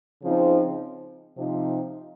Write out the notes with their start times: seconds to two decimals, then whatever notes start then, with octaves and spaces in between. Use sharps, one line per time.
0.22 C#3 F3 C4 D#4
1.37 C3 F3 C4 D#4